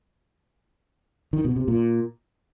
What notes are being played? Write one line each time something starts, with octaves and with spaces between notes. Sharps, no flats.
D#3
B2
C3
A#2